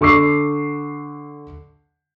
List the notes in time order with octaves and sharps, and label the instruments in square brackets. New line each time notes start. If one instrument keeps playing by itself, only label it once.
[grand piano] D3 C#6 D6 E6 C7